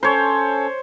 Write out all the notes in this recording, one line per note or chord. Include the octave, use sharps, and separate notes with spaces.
C#4 A4 C5 C#5